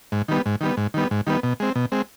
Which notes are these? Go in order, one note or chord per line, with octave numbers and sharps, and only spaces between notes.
G#2
D#3 G3 B3
G#2
D#3 G3 B3
G#2
D#3 G3 B3
G#2
D#3 G3 B3
B2
G#3 C4
B2
G#3 C4